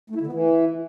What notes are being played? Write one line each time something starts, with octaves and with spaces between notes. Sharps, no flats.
A3
E4
D3
B3
E3